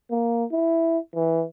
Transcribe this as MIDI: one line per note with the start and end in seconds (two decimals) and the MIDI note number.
0.11 0.45 58
0.52 0.98 64
1.16 1.44 52